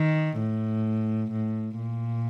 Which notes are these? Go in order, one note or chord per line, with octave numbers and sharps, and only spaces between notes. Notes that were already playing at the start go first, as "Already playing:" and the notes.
Already playing: D#3
A2
A2
A#2